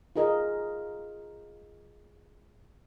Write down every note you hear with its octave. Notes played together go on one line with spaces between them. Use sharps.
F4 G#4 A#4 D#5